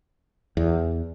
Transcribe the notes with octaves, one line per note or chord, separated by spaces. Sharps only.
E2